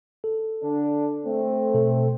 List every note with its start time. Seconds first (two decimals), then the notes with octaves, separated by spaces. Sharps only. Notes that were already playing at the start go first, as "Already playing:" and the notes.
0.24 A4
0.63 D3 D4
1.25 A3 C4
1.74 B2 A4